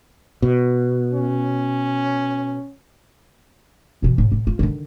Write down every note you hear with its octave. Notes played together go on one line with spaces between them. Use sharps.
B2
C#4
B2 E3
A2
A2
F4
D3 D#3